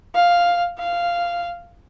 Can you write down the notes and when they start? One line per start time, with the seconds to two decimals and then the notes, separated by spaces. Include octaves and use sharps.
0.15 F5
0.78 F5